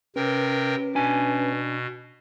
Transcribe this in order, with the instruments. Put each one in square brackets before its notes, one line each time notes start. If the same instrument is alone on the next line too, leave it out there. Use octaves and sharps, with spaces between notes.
[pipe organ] C3 A#4 G5 [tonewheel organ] C#4 B4
[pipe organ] B2 [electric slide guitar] D4 G#5